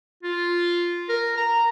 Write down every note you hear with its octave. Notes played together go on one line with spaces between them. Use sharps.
F4
A#4
A#5